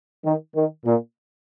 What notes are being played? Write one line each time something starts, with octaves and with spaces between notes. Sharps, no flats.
D#3
D#3
A#2